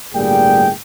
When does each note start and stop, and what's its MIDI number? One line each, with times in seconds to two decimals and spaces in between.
0.14 0.70 31
0.14 0.70 45
0.14 0.70 55
0.14 0.70 58
0.14 0.70 68
0.14 0.70 79